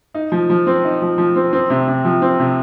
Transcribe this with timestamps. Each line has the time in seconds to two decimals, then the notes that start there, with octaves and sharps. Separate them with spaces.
0.14 D#4
0.32 F3
0.50 F3
0.67 C4
0.85 D#4
1.02 F3
1.18 F3
1.36 C4
1.53 C4
1.70 C3
1.88 C3
2.05 F3
2.22 C4
2.39 C3